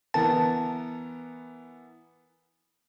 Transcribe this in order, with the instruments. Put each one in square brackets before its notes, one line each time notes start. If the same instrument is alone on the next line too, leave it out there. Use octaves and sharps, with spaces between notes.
[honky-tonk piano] E3 B3 A#4 [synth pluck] A5